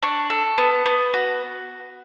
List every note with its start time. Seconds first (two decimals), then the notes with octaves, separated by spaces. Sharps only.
0.03 D4 C#6
0.30 A4
0.58 B3
0.86 B3
1.14 F#4